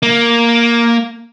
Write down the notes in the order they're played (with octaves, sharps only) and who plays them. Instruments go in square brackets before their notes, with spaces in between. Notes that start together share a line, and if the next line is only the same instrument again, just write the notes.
[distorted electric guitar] A#3